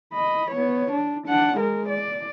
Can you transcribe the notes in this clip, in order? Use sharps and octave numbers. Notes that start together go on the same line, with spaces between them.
D#5 B5
B3 C#5
D4
D4 F#5
G#3 A#4
D5